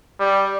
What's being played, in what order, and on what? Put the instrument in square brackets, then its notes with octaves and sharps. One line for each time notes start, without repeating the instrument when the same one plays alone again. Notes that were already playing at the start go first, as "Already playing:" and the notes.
[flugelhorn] G3